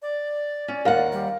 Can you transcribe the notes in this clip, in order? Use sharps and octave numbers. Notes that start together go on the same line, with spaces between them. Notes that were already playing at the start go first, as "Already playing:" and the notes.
D5
C#4
D#2 A#4 F5 F#5
G3